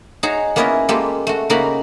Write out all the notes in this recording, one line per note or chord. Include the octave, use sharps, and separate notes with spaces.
D#4 F#4 G#4 C#5
A#3 B3 C#4 E4 A#4 D#5
G#3 A#3 F4 G4 A4
A3 F#4
C#3 A#3 D#4 F#4 A#4 B5